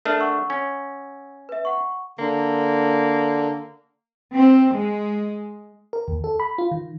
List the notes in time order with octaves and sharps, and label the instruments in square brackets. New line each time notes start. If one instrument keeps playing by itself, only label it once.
[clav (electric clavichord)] A3 D4 [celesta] A#4 E5 F6
[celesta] F#5 C#6 E6
[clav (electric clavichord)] C#4
[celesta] B4 E5
F#5 C#6
[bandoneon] D3 [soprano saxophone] A#3
[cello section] C4
G#3
[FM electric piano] A#4
D#2
A4
B5
F4
D#3